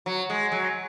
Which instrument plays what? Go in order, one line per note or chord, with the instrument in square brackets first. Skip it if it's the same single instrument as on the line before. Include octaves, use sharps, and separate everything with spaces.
[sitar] F#3
G#3
F#3